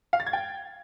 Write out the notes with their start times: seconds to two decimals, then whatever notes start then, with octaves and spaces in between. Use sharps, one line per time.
0.13 F5
0.20 A6
0.27 G#6
0.33 G5